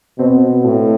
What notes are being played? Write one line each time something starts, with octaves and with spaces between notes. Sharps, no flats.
B2 C4
A2